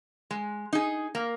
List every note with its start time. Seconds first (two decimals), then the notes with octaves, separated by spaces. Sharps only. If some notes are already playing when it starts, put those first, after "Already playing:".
0.31 G#3
0.73 D#4 G#4
1.15 A#3